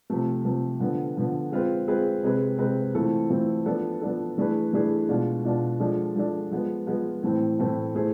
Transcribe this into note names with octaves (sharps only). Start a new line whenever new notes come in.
C3 F3 A3
C3 F3 A3
D3 F3 B3
D3 F3 B3
G#3 C4 F4 G#4 B4
G#3 C4 F4 G#4 B4
C3 G#3 C4 G#4 B4
C3 G#3 C4 G#4 B4
E3 A3 C4 F4 A4
E3 A3 C4 F4 A4
F3 B3 D4 A4
F3 B3 D4 A4
E3 A3 D4 G#4 B4
E3 A3 D4 G#4 B4
B2 G#3 D4 F4
B2 G#3 D4 F4
F3 G#3 D4 A4
F3 G#3 D4 A4
F3 G#3 B3
F3 G#3 B3
A2 E3 A3 C4
A2 E3 A3 C4
A3 E4 G#4 C5